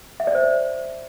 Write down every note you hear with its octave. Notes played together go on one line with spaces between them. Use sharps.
E5
D5
C5